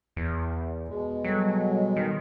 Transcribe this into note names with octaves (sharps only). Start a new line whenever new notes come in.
E2
B2 G#3
F#3 G3 A4
D#3